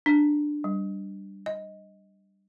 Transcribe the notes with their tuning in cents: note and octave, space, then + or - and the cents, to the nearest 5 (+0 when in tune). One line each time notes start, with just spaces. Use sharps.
D4 +10
G3 -5
D#5 +10